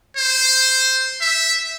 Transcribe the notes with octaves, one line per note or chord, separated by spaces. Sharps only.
C5
E5